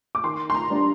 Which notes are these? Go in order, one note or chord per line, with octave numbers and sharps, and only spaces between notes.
D6
D#3 C6
C6
A#5
G3 D4